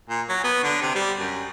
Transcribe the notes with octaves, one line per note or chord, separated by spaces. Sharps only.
A#2
F#3
B3
D3
C3
G3
F#2